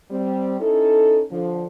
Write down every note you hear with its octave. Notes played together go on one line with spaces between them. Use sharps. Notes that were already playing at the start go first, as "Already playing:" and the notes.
G3 C4
C#4 D#4 E4 A4
D3 F3